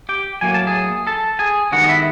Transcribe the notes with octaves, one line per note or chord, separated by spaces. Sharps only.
G4 G5
A2 F#3 A#3 G#5
A5
G#4 G#5
A4 A5
G#4 G#5
G2 D#3 G#3 B3 F#4 F#5
D#5
E4 E5